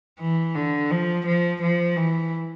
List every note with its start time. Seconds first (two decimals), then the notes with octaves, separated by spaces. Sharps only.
0.20 E3
0.55 D3
0.91 F3
1.25 F3
1.61 F3
1.96 E3